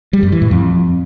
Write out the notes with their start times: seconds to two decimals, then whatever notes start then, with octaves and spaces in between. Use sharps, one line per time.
0.13 G3
0.23 F#2
0.32 E3
0.42 A2
0.51 F2